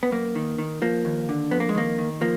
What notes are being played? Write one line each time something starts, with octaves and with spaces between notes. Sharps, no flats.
B3
F#2 A#3
D#3
D#3
F3 A#3
D#2
D3
F2 B3
A#3
G#3
D#3 A#3
D#3
F3 A#3